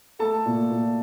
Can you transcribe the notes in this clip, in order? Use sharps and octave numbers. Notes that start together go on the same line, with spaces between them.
A3 A4 A5
A#2
A#2